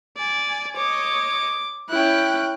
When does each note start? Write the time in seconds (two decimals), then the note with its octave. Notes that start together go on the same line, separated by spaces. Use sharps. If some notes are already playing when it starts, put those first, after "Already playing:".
0.17 D5 G#5
0.76 C#5 D#5 D6
1.89 C#4 E4 G5 F#6